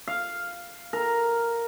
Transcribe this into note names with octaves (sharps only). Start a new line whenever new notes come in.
F5
A#4